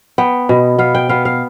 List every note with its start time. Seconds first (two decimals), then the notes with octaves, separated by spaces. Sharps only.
0.18 B3 G5
0.49 B2
0.78 B3 F5
0.95 G5
1.09 B3 F5
1.25 F5